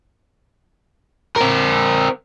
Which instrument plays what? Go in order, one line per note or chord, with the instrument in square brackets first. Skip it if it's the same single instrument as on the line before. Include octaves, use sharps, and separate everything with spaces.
[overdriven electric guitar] C4 A#4